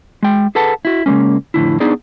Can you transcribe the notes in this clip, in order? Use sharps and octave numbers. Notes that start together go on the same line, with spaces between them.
G#3 G5
G#4 A4 B4 F#5 A5
E4 F#4
C#3 E3 G#3 A#3 C#4
F2 A2 D3 E4
B3 D4 D#4 G#4 D5